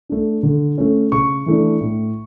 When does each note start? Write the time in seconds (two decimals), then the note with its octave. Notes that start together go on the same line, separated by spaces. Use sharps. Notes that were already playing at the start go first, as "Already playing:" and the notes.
0.09 A3 D4
0.43 D3
0.78 A3 C#4
1.12 C#3 C#6
1.46 E3 A3 D4
1.81 A2